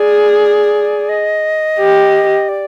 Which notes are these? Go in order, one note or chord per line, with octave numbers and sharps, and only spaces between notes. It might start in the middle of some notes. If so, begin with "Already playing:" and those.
Already playing: G#4 D5
D#5
G4
D5